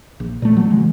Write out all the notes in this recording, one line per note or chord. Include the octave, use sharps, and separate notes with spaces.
A#1
A#2 A3
F#3 A3
C#3 E3 G#3